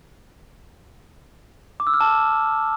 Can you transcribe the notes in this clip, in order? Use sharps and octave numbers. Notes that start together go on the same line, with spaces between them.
D6
E6
F6
A5